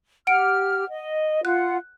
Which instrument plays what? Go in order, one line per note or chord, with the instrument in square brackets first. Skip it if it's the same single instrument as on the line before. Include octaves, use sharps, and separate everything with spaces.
[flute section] G4 F6 [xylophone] F#5 D7
[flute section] D#5
[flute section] F4 F#5 [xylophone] F#6